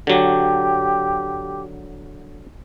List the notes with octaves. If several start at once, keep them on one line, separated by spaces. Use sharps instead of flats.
D3 F#3 G4